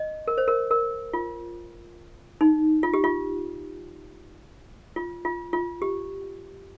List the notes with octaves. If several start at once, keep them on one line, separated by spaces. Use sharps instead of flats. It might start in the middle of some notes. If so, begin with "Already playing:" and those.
Already playing: D#5
A#4
C5
A#4
A#4
F4
D#4
F4
G4
F4
F4
F4
F4
G4